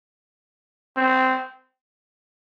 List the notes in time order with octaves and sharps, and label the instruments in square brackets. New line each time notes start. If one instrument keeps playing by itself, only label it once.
[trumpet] C4